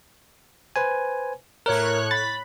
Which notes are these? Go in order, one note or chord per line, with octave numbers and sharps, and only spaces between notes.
B4 C5 G#5
A2 A#4 C#5 F#6
B5 A6